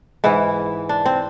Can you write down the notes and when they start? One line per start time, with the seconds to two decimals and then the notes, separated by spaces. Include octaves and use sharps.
0.24 G#2 E3 E4
0.89 D4
1.05 C4